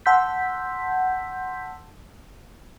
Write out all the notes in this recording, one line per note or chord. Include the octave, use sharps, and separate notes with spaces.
F#5 A5 C6 E6 G6 B6